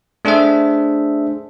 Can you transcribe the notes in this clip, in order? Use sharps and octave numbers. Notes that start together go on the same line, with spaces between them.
A3 D4 G#4 C5 E5